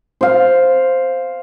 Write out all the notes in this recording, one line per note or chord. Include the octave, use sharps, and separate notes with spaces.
C5 F5